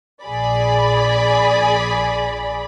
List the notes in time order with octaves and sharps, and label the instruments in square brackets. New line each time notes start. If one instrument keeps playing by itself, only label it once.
[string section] A#1 G#4 D5 B5